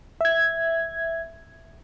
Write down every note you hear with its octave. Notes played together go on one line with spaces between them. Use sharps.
E5 G#6